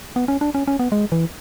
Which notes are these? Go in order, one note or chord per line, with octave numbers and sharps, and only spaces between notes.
B3
C#4
D4
C#4
C#4
B3
G#3
E3